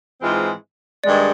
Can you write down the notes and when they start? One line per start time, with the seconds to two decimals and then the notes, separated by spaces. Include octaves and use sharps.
0.21 G#2 E3 G#3 C4 F4
1.04 G2 D#3 G#3 D5